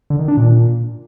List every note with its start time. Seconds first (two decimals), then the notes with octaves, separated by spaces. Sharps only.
0.10 D3
0.19 D#3
0.28 D4
0.37 A#2